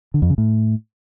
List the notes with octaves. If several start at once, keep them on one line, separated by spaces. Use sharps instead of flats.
D3
F2
C#3
A2